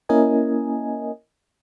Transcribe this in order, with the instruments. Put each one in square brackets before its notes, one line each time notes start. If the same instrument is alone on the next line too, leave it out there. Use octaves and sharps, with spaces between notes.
[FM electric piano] A#3 C#4 E4 A#4 D#5 G#5